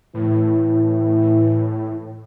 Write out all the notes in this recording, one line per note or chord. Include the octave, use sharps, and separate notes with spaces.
A2 E3